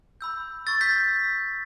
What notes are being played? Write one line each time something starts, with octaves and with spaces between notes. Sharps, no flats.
B5 E6 G6
C#6 E6 G6 A6
G6 B6